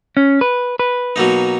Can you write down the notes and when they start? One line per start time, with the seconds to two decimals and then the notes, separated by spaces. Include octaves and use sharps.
0.17 C#4
0.41 B4
0.79 B4
1.16 B2 F#3 A#3 D#4